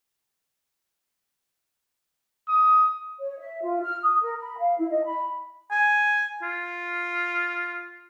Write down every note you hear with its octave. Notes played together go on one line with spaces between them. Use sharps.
D#6
C#5
E5
F4
F6
D#6
A#4
B5
F5
E4
D#5
B5
G#5
F4